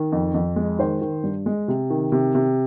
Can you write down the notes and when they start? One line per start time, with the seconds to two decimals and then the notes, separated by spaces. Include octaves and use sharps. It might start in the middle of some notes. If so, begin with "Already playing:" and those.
Already playing: D#3
0.12 F2
0.34 F2
0.56 G#3
0.79 D#3 C5
1.01 D#3
1.23 G2
1.46 G#3
1.68 C3
1.90 D#3
2.12 C3
2.35 C3